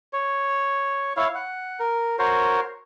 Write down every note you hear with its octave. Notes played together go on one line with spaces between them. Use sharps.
C#5
E4 C#5 F5
F#5
A#4
F#4 A#4 C5 C#5